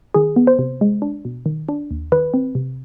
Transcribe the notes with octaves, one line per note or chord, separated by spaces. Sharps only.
D#3 G#4
B3
C5
C3
G#3
D4
B2
D#3
D4
D#2
D#3 B4
C4
C3